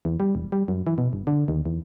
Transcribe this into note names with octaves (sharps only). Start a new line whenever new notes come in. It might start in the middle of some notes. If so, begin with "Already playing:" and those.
E2
G3
E1
G3
F#2
E3
B2
G1
D3
D#2
E2